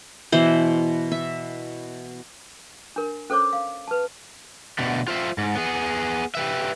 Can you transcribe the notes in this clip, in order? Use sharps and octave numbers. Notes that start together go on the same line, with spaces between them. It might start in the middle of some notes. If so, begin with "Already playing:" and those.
B2 E3 C5
E5
D4 A#4
C#4 A4 C5 C#5 D6
F5
B4 A5
B2 D3 A3
F4 C5 E5
G#2
B3 G#4
G4 B4 E5